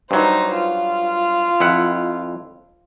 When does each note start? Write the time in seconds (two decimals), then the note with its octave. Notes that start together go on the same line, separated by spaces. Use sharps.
0.11 G2 F#3 D#4 C5
0.54 F4
1.60 F2 E4 F#5